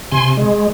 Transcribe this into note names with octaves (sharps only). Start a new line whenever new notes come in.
C3 G#5 C6
G#3